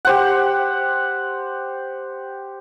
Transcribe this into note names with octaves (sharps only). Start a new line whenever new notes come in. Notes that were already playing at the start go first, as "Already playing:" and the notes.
G4 C5 F#5